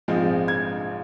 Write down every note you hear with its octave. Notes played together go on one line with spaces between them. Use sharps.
A#1 G#2 F3 G#3 C4
G#6